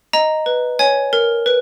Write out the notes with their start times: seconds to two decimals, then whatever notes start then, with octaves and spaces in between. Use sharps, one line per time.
0.13 D#5 A#5
0.46 B4
0.79 C#5 G#5
1.13 A#4
1.46 B4